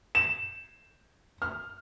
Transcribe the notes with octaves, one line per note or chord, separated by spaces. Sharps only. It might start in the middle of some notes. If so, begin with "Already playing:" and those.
E7
F6